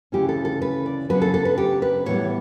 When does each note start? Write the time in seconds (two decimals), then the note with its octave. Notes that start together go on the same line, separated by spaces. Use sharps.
0.12 D2 C#3 E3 A3 C#4 G4
0.29 A4
0.45 A4
0.62 B4
0.86 D5
1.09 C#3 F#3 B3 D4 B4
1.22 A4
1.34 A4
1.45 B4
1.58 G4
1.82 B4
2.06 A2 E3 G3 B3 C#5